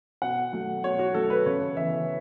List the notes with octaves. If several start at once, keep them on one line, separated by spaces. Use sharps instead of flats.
B2 F#5
F#3 A3
B2 C#5
F#4
F#3 A3 A4
B4
C#3 C#5
E3 B3 E5